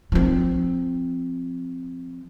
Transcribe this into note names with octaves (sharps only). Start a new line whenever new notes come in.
F3 C4